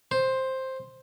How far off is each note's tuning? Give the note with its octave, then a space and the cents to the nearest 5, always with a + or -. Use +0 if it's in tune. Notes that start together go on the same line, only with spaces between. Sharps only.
C5 +5